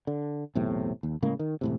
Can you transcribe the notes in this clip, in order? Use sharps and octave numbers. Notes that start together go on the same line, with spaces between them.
D3
B1 E2 A2 C3
D#2
A2 C#3 G#3 A#3
D#3
E1 A2 C3